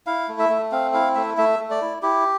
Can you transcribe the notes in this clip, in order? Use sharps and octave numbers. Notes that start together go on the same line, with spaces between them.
E4 F5
A3
E5
A3
C4 F5
E4 F5
A3 E5
A3 E5
A3
D5
E4
E4 G4